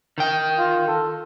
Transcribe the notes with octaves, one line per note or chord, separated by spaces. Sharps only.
D#3 G5
F4
A4